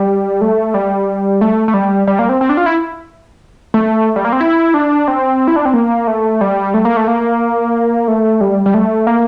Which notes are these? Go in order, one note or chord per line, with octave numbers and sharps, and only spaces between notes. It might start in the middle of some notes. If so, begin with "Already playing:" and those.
Already playing: G3
A3
G3
A3
A3
G3
G3
A#3
C4
C4
D4
F4
E4
A3
G3
A#3
C4
E4
D4
C4
E4
D4
C4
A#3
A3
G3
A3
A#3
A3
A#3
A3
G3
G3
A3
A#3